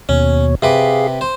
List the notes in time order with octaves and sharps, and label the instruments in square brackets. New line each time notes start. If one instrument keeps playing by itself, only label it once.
[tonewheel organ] D#2 B2 C#5 [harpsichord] C#4
[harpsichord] C3 B4 D6 [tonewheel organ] G#4 F5
[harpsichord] C5